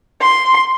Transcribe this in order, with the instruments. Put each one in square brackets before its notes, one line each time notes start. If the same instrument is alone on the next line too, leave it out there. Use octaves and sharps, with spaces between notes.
[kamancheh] C6